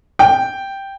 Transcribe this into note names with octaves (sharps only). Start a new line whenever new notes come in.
G5